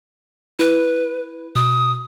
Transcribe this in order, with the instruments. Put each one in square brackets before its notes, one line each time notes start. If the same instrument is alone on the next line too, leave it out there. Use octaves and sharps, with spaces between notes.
[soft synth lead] E4 [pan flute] B4
[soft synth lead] B2 [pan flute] D#6